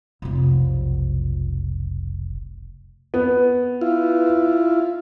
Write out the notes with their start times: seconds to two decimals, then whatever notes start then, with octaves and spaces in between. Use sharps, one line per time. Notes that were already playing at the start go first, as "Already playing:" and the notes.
0.22 F1 B1
3.14 B3
3.81 E4 F4